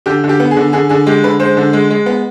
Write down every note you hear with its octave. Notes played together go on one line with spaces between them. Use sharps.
D3 G4
D3
G4
B3
G#4
D3
D3 G#4
D3 G#4
G#3 G4
D3 B4
G#3 C5
D3
G#3
G#3
B3